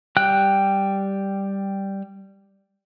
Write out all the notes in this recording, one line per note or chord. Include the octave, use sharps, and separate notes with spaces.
G3 G5 F#6